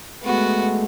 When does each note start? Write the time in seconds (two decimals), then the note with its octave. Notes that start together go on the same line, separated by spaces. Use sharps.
0.23 G#3 A3 B3 F#4